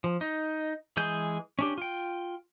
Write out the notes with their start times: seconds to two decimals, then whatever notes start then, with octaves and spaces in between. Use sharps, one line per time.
0.04 F3
0.21 D#4
0.97 E3 G#3 G#4 G6
1.59 C#4 D4 G4
1.78 F4 G5